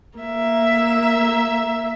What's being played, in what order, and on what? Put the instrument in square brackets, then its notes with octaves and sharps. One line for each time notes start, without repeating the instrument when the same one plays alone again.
[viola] A#3 E5